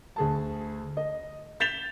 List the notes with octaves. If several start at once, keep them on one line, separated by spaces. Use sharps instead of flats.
D2 G#4 A5
D#5
G6 A6 B6 E7 F7 G7